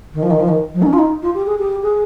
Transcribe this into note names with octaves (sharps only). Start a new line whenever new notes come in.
D#3
F3
D#3
F3
D#3
F3
D#4
C#4
F4
D#4
F4
G4
G#4
G4
G#4